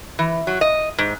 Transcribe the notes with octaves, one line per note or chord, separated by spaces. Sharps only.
E3
F#3
D#5
G#2